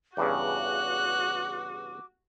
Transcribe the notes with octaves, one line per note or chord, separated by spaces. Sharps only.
E2 G2 C#3 F#4 D6 F#6